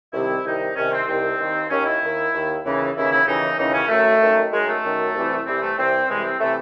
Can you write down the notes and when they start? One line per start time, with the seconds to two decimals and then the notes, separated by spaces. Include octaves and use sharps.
0.13 C2 C3 D#3 E4
0.45 C2 C3 D#3 D#4
0.75 C2 C3 D#3 C#4
0.92 C4
1.07 C2 C3 D#3 C4
1.38 D#2 D#3
1.70 D#2 D#3 C#4
1.85 E4
2.02 D#2 D#3
2.33 D#2 D#3
2.64 D#2 C#3 E3
2.95 D#2 C#3 E3 E4
3.11 E4
3.26 D#2 C#3 E3 D#4
3.57 D#2 C#3 E3 D#4
3.73 C#4
3.89 F#2 D#3 A3
4.20 F#2 D#3
4.52 F#2 D#3 G#3
4.68 A3
4.84 F#2 D#3
5.14 C2 C3 E3
5.46 C2 C3 E3 C4
5.61 A3
5.78 C2 C3 E3 C4
6.08 C2 C3 E3 G#3
6.24 C4
6.39 C3 E3 A3